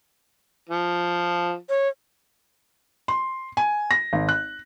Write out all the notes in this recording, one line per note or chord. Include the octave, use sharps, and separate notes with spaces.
F3
C#5
C6
G#5
A#6
G#1
F#6